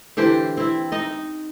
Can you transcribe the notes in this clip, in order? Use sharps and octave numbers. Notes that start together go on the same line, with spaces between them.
D3 E3 G4 C5
C4 E4
D#4 D#5